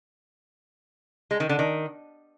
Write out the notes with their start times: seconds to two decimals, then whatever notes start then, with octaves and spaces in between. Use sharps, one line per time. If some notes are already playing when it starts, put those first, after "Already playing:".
1.31 G#3
1.40 D#3
1.49 D3
1.59 D#3